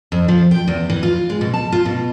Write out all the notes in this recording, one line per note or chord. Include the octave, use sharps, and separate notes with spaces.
F2
F3
G5
E2
E3
F4
G#3
B2
A5
F4
B2